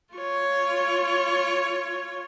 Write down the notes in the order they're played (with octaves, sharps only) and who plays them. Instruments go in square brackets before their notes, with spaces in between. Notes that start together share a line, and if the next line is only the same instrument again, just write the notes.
[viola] F4 C#5